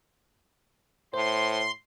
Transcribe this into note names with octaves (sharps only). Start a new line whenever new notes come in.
A2 C5 C6